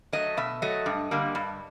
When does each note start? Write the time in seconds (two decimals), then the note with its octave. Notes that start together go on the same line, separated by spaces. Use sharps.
0.13 F#3 A3 D#5
0.37 B2 E5
0.62 F#3 A3 D#5
0.86 G2
1.11 D3 G3 A#3
1.35 G2